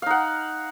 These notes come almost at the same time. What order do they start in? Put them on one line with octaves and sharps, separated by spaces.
F5 D#4 F#5